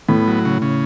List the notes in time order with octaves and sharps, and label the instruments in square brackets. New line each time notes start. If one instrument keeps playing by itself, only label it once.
[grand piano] A2 [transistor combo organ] B3
[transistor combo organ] F#3
C#3
C#3